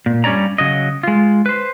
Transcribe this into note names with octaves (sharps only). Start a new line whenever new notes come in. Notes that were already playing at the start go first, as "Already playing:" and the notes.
A#2
G2 G3 C#4 C#5 D5 A#5
C#3 F#3 D#5
G#3 F4
B4 C5